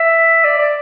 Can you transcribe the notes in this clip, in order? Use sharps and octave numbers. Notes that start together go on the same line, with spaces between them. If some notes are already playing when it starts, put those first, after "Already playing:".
Already playing: E5
D5
D5